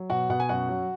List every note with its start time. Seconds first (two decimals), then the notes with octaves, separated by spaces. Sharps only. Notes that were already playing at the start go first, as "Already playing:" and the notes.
Already playing: F#3
0.10 B2 F#4 F#5
0.29 B2 F#5
0.40 G#5
0.49 F#2 F#4 F#5
0.69 F#3